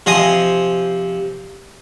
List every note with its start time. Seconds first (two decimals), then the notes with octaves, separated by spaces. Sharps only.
0.06 C3 F3 D#5 G#5 C6 D#6